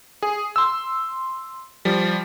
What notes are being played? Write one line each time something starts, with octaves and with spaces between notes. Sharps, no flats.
G#4
C6 E6
F3 G3